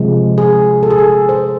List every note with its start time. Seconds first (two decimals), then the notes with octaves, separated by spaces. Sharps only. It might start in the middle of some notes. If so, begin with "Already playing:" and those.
Already playing: C3 F3 G#3
0.38 G#4
0.83 A4
0.90 G#4
0.98 A4
1.29 C5